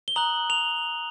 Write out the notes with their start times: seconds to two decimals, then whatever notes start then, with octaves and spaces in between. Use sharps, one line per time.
0.08 G7
0.16 A#5 D#6 F#6 F#7
0.50 F7